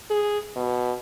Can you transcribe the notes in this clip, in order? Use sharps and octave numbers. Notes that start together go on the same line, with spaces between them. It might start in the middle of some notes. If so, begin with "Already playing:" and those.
G#4
B2